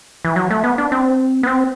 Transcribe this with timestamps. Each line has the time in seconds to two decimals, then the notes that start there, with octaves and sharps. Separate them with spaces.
0.25 E3
0.36 F#3
0.50 A3
0.64 B3
0.78 D4
0.92 C4
1.43 B3
1.47 C4